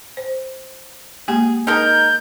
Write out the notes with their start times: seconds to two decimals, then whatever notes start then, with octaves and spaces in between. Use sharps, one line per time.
0.17 C5
1.28 G#3 A#3 G4 G#4
1.67 D#4 G#4 A#4 G6